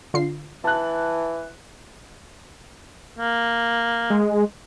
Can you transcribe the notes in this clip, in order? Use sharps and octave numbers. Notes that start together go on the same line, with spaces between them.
D3 F4 C7
E3 A5 F#6
A#3
G#3